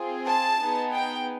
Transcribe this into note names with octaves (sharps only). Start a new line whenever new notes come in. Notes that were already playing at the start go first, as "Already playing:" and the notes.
Already playing: C4 F4 G#4
A5
B3 D#4 G#4
G5